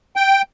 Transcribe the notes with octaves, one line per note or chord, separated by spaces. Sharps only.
G5